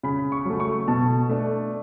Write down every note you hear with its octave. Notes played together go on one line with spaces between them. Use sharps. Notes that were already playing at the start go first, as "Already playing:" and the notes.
C#3 B5
C#6
F#3 A3
C#6
B2 A5
A3 D4